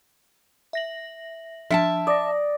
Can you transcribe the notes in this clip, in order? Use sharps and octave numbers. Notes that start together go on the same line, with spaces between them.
E5 A#6 F#7
F3 D4 E5 F#5 A5
D5 D#6 A#6